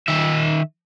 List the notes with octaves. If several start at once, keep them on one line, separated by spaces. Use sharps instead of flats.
D#3 E5